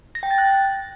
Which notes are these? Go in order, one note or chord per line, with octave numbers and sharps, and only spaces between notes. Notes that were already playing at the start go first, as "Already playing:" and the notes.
A#6
G5
A6
F#6